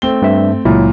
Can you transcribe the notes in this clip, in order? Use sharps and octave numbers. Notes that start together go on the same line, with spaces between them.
A3 C4 G7
G2 E5
C#2 A#2 F#3 E4